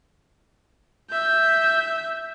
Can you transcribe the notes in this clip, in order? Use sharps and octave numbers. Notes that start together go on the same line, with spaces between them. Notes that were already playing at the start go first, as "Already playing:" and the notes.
E5 G6